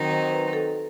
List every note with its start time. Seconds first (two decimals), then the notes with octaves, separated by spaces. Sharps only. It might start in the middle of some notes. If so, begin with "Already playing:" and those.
Already playing: D#3 F#3 C4 D#4
0.11 C5
0.32 B4
0.53 A4